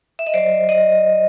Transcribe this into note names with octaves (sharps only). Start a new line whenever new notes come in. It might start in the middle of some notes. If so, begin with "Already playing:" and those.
E5
D#5
F#3 C5 D5
D#5